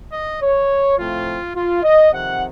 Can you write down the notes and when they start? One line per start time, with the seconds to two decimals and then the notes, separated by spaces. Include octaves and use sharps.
0.13 D#5
0.42 C#5
0.98 A2 F3 A3 C4 F4
1.55 F4
1.83 D#5
2.12 F2 C3 D#3 F#5